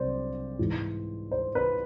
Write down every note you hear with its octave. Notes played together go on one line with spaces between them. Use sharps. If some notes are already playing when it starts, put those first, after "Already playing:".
Already playing: C2 F#3 C5 D5
G#2 E3
C5
B4